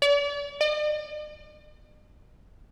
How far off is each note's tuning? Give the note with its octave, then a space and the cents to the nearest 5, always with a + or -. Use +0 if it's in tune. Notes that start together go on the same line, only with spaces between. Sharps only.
D5 -40
D5 +45